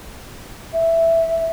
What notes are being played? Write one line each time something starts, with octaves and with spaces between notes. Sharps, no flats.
E5